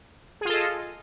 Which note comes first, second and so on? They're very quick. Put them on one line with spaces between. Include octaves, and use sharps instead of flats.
G#4 F4 A4 D#5